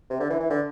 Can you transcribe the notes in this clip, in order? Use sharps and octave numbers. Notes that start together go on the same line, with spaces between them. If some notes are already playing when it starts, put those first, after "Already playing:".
C3
D3
E3
E3
D3